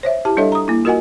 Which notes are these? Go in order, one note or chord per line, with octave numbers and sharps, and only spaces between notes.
C5 C#5 E5
E4 G4 A5
G3 D4 A4 C#5 D#5 E5
A#5 D#6
A#3 E4
F4 F#4 A#4 D#5 F#5 G#5